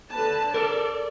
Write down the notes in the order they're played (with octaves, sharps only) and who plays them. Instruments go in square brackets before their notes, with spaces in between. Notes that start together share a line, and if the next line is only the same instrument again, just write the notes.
[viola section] D3 B4 A5
[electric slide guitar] A4 A#4 [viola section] D5